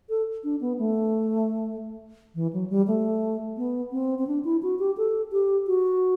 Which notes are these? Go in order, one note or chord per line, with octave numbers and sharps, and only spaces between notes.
A4
D4
B3
A3
E3
F#3
G3
A3
B3
C4
C4
D4
E4
F#4
G4
A4
G4
F#4